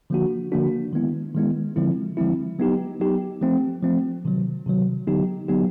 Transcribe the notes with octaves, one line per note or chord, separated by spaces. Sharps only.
D3 F3 A#3 D4 F#4
D3 F3 A#3 D4 F#4
D#3 G#3 B3 E4
D#3 G#3 B3 E4
D3 F3 G#3 C4 E4
D3 F3 G#3 C4 E4
F#3 B3 D#4 G4
F#3 B3 D#4 G4
F3 A3 C4
F3 A3 C4
C3 D#3 F#3
C3 D#3 F#3
D3 F#3 B3 D#4 G4
D3 F#3 B3 D#4 G4